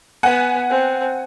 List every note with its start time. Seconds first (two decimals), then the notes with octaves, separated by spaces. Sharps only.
0.23 B3 F#5 G#5
0.70 C4